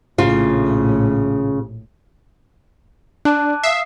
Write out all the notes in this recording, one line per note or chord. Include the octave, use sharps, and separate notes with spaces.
A#1 A2 C#3 F4
D4 A5 D6 F#6
E5 F5 D#6 C7